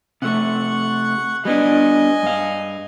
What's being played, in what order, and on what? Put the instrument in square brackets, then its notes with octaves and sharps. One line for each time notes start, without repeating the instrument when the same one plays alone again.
[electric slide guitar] C3 A3 [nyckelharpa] F#5 C#6
[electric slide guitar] G3 B3 D4 [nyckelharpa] D#5 G#5
[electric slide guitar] G2 F5